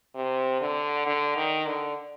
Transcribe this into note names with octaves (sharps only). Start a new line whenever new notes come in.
C3
D3
D3
D#3
D3